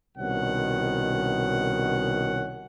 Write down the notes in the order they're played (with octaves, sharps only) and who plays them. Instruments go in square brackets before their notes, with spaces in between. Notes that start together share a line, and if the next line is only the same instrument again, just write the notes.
[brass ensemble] C2 B2 D#3 C#4 F#5